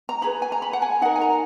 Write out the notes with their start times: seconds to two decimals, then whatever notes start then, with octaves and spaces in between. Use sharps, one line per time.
0.09 A#5
0.22 D#4 G#4 B4 B5
0.42 G#5
0.52 A#5
0.62 B5
0.73 F#5
0.82 G#5
1.02 D#4 A#4 F#5
1.16 G#5
1.21 A#5